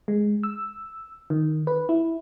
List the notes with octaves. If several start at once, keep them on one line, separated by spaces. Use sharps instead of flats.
G#3
E6
D#3
B4
E4